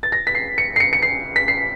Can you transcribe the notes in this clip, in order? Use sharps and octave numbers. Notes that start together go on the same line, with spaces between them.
A6
A#6
B6
C7
C#7
C7
C#7
C#7
C7
B6
C7